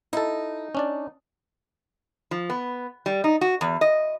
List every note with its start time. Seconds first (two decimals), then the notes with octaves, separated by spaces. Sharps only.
0.13 D#4 E4 A4
0.75 C#4 D4 D5
2.31 F3
2.50 B3
3.06 G3
3.24 D#4
3.41 F#4
3.61 E2
3.81 D#5